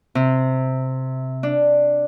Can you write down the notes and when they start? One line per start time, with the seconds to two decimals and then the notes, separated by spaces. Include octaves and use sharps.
0.15 C3
1.43 D4